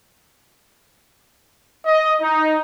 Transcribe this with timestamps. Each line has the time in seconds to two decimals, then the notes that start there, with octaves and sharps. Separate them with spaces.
1.85 D#5
2.22 D#4